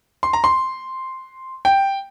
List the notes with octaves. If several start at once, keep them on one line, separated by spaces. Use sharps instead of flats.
C6
A#5
C6
G5